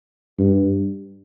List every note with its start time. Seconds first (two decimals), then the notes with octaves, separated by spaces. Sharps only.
0.39 G2